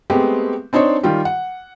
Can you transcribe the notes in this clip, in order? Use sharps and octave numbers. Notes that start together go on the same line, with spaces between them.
G#3 A3 B3 C4 G4
C4 D4 D#4 C5 C#5
D#3 G3 F4 G4
F#5